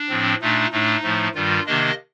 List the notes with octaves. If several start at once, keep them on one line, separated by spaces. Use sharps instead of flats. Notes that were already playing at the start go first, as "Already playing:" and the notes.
Already playing: D4
A2 F3 C4
A#2 A3 D4 D#4
A2 A3 D4 D#4
A2 F3 A3
G2 D#3 G3 F4
C3 D#3 A#3 D4 D#5